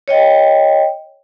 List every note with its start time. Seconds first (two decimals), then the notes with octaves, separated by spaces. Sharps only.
0.08 C#5 D#5 G5